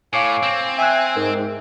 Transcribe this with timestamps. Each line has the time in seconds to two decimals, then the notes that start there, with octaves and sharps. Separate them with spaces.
0.13 A2 C#5 F5 G#5 D6 C7
0.43 C4
0.78 E5 G5 G#5 E6 F#6
1.16 G#2 A#4